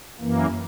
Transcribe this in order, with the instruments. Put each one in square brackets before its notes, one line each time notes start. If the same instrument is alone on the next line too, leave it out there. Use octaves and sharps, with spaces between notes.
[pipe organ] F#2 E3 A#3